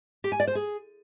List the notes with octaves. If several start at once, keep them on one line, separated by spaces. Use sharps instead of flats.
G4
G#5
D5
C5
G#4